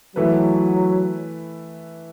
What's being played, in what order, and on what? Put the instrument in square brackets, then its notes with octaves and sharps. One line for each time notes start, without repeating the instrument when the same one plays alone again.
[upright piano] E3 A3 E4 B4 [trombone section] F#3